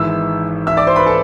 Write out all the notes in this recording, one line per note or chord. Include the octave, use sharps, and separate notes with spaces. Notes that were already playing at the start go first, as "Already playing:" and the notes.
Already playing: G#1 G#2 E3 E5 E6
E5 E6
D5 D6
C5 C6
B4 B5
A4 A5